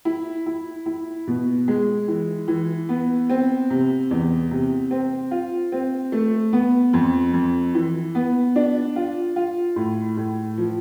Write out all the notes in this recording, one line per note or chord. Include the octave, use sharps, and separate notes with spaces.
E4
E4
E4
B2
G#3
E3
E3
B3
C4
C3
E2
C3
C4
F4
C4
A3
B3
F2
F2
E3
B3
D4
F4
F4
A2
A2
F3